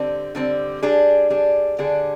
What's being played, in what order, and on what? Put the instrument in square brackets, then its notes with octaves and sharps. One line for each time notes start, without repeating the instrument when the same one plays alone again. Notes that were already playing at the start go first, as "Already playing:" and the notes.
Already playing: [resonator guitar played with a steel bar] D3 G3 C4
D3 G3 C4
G3 D4 G#4
G3 D4 G#4
D3 G3 D4 G#4